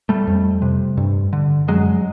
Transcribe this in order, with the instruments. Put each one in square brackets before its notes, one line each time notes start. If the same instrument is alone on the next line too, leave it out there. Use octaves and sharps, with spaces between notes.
[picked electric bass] G3 A3
F2
C3
G2
D3
F#2 F#3 G#3